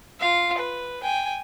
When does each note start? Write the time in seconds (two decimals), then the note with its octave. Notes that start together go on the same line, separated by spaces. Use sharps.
0.20 F4 F5
0.58 B4
1.03 G5 G#5